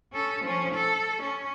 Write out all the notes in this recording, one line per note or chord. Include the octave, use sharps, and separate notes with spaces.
C#4 A4
F3 C#4
A4
C#4